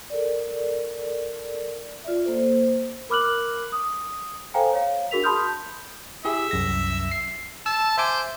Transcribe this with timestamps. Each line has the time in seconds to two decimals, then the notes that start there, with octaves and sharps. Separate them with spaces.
0.10 A4 A#4 D5
2.04 F4 D5 E5
2.26 A#3 A4 C5
3.10 A#4 B5 D6 F6 F#6 F#7
3.72 D#6
4.54 A4 C5 F5 G5 G#5 A#5
4.73 C#5 F5
5.11 D4 F#4 G#4 A#4 B6 F7
5.24 A5 B5 C6 D#6 F6 G6
6.25 E4 G4 G#4 E5
6.51 C2 F#2 A#6
7.12 C7
7.66 A5 E6
7.98 C5 E5 G#5 D6